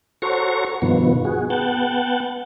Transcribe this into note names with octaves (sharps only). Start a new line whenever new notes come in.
F#4 A4 C5 C#5 A#5 C#6
G2 B2 D#3 F3 B3
F#4 G#4
B3 F#5 G5 A5